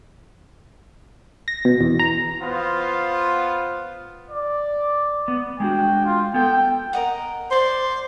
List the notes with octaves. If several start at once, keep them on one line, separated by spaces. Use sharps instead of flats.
A#6
B2
E2
A#5
B3 F4 C5 F5
D5
B3
G#3 D4 F#4 G5
F4
B3 A4 G5
A#4 D#5 F#5
C5 D5 C6